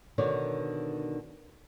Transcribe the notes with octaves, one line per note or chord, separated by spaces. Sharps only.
B2 D3 D#3 C#5 D5